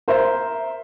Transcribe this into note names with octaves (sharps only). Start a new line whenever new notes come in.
A#4 C5 E5